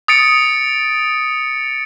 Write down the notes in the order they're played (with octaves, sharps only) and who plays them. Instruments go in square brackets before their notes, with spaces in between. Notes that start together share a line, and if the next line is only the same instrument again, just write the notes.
[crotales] D#6 A6 C#7 D7